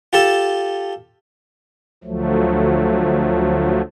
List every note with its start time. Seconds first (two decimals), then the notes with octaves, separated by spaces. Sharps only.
0.13 F4 G4 A4 A5
2.04 D2 F3 F#3 A3